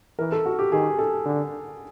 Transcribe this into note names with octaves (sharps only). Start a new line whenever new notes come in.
E3 A#4
A4
F#4
G4
D#3 G#4
A4
D3